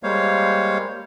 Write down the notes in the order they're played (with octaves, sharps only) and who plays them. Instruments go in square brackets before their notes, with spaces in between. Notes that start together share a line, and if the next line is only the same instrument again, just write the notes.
[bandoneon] G3 G#3 A#3 C5 C#5 F5